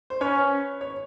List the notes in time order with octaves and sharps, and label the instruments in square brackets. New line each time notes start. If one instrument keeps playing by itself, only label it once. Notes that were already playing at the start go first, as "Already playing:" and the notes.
[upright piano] C5
[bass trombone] C#4 [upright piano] B4 C#5
[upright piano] C#5